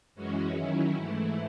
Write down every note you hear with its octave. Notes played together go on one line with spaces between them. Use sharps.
F#2 E3 G#3 C#4 F#4
D#3 F#3 C#4 E4
G#2 E3 A3 E4